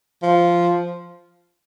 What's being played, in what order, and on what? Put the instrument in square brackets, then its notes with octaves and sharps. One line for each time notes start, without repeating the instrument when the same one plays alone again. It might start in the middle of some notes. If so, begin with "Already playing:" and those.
[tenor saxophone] F3